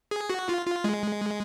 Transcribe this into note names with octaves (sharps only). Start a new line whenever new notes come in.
G#4
F#4
F4
F4
G#3